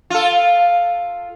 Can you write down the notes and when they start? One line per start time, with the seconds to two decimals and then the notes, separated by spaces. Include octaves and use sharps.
0.10 F4 A4